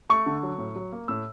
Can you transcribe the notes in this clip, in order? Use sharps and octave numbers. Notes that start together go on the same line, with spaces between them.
A3 C#6
D3
F#3
A2
F#3
A#3
A2 E6